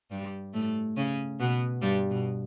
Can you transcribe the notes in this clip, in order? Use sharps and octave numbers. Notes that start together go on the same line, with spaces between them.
G2 G3
A2 A3
C#3 C#4
B2 B3
G2 G3
B2